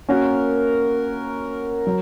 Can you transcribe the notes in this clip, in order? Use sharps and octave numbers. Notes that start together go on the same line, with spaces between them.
A#3 C#4 F#4 A#4
F#3